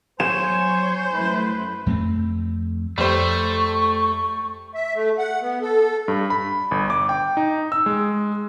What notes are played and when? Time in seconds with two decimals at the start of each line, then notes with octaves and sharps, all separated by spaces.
0.20 F#3 C5 C#5 G#5 E7
1.14 F#2 A3 E4 B4
1.86 F2 A3 A#3 C4
2.98 F2 G3 A3 C5 C#6
4.75 E5
4.94 A3
5.18 F#5
5.41 B3
5.62 A4
6.08 G2
6.30 B5
6.71 G1
6.90 D6
7.09 G5
7.37 D#4
7.72 E6
7.86 G#3